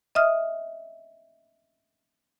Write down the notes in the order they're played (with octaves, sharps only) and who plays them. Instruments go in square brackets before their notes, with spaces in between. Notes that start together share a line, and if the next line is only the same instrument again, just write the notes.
[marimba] D#5 E5 D#6 F6